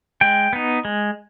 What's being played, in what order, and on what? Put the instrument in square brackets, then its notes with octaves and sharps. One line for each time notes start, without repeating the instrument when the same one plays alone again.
[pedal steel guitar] G#3 G5
B3 D#4
G#3